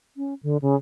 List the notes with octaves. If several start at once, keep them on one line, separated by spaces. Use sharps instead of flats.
C#4
D3
C#3